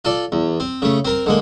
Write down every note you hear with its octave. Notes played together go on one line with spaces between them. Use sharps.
F4 A4 D5
E2
C4
C#3 A3
C4 A#4 A#5
D3 G#3 A#3